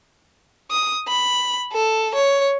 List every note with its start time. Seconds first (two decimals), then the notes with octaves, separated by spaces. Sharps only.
0.71 D#6
1.08 B5
1.73 A4
2.15 C#5